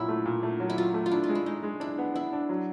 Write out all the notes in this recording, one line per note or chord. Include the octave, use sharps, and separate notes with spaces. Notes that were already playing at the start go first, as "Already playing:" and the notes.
Already playing: A#2 F#3 E4
A3
A#2
A3
F#3
E4
F#3 F4
A3
F4
D4 E4
F4
G#3
E4
G#3 D#4
G#3
D4 E4
B3
B3 E4
D4
F#3